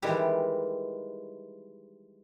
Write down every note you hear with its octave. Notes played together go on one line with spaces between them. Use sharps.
D#3 E3 G3 G#3 E4 G4